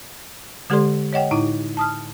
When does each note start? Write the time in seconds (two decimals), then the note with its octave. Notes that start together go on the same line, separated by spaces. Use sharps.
0.70 D3 G#3 G4 A4 D5 C6
1.13 C#5 D#5 F#5 G5
1.31 A2 D#4 E4
1.77 A5 D#6 F6